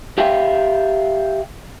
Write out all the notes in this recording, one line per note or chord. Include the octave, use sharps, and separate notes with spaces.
G4 E5 F5 G5